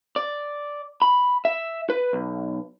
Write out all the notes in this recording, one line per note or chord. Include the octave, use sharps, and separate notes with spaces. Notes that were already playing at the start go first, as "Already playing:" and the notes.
D5
B5
E5
B4
B1